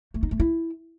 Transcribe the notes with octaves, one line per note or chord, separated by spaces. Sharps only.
A3
D#4
A3
E4